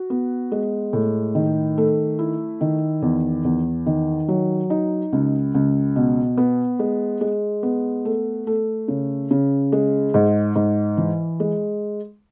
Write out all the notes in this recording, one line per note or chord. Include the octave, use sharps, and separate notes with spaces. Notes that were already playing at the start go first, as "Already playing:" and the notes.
Already playing: F#4
B3
G#3
A2
D#3
A3
E4
D#3
E2
E2
D#3
F#3
D#4
C#2
C#2
B2
B3
G#3
G#3
B3
A3
A3
C#3
C#3
G#3
G#2
G#2
E3
G#3